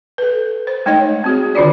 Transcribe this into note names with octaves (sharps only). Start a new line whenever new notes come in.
A4 B4
C5
G#3 A3 D#4 C#5 D#5 G5
C4 F#4 G#4
D3 D#3 D4 F4 F#4 D5